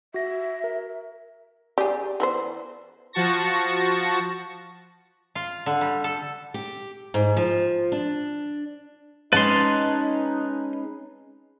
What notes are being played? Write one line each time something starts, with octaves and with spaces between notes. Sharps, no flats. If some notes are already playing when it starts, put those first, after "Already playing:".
F#4 E5 A#6
A#4
G4 G#4 D5
E3 B3 C5
F3 F#4 A5 C#6 A#6
F4
D3
G3
A4
G4
G#2
F3
D4
G#3 C#4 D#4 B4 A5 C6